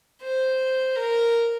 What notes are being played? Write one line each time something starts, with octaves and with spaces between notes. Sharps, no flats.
C5
A#4